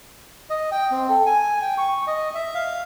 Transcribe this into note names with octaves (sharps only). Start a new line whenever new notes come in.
D#5
G5
C4
A4
G#5
G5
C#6
D#5
E5
F5